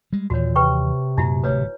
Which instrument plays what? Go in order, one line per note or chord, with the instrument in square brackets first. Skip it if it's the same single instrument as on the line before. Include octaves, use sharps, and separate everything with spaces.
[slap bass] G3 G#3
[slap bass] D#2 E3 [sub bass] A#2 [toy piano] F#4 C#5
[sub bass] C3 [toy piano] B4 G5 C#6
[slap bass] F#2 A#2 [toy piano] D#4 E4 F#4
[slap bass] D1 A2 A3 [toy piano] B4 C#5